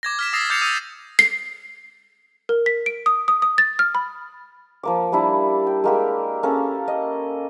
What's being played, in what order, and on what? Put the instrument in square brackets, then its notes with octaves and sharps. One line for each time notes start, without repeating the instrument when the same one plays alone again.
[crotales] D6 G#6 A#6
F6 B6 E7
D#6 E6 A6 A#6 C7
D6 G6 A6 C7 C#7 F7
D#6 E6 G6 A6 D#7
[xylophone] C7
A#4
B6
D7
D#6
D#6
D#6
A6
F6
B5
[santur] F3 A#3 D6
G3 A#3 D4 E4
G5
G#3 A#3 G4
A#3 C#4 A4
D#5